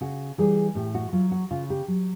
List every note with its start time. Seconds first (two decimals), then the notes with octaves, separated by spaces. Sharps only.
0.01 C#3 F#4
0.38 E3 G3 G#4
0.75 A2 G4
0.95 F#4
1.13 F#3 F4
1.32 F#4
1.51 C#3 F4
1.70 G4
1.88 F#3